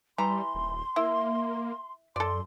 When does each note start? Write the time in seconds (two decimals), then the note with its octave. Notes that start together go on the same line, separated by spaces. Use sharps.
0.18 E3 G3 A#5 C6
0.54 D#1
0.96 A#3 E4
2.16 F#2 A4 D5 C6